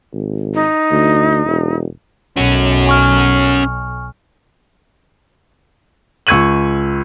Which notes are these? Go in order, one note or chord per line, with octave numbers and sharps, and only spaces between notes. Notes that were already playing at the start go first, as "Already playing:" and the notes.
G#1
D#4
D2
E1
B1 C#4 F#4
G#5 C#6 F6
C#2 C#6 E6 G#6 D#7 F#7